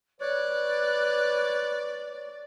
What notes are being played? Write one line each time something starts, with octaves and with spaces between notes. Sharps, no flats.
B4 C#5 D5 F#6